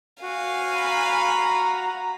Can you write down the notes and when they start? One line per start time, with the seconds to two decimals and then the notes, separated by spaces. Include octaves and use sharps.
0.22 F#4 F5 G#5
0.77 A#5 B5